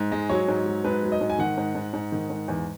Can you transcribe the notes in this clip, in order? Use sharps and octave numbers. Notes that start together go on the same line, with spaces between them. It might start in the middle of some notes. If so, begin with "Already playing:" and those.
Already playing: G#2
G#3
F#3 C#5
G#2
F#3
G#2 B4
F#3
D#5
G#2
G#5
D#3 F#5
G#2
G#2
G#2
D#3
G#2
E2